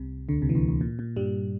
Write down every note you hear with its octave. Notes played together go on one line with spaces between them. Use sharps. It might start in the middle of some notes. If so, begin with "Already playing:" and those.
Already playing: C2 C3
D2 D3
C2 C3
E3
D2 D3
D2 D3
A#2
A#2
G2 G3